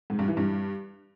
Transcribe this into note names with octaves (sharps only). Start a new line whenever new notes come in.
G#2
G2
E3
G2